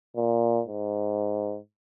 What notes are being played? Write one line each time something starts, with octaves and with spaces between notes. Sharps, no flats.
A#2
G#2